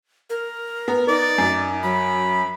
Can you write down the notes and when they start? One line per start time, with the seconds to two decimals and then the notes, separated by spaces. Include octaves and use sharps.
0.30 A#4
0.88 B3 A#5
1.08 D#4 D5
1.38 F#2
1.83 F#3 B5